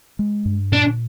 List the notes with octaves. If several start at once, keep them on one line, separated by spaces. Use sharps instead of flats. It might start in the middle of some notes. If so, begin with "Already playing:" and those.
G#3
G2
A#2 D4